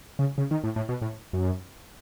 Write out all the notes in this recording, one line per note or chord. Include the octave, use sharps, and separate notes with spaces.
C#3
C#3
D#3
A2
A2
B2
A2
F#2